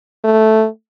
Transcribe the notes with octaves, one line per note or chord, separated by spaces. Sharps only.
A3